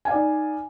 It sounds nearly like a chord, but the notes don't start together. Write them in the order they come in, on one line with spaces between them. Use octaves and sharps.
G#5 F5 D5 D#4